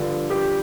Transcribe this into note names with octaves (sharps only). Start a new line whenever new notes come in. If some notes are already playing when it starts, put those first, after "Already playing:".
Already playing: G2 D3 F3
G4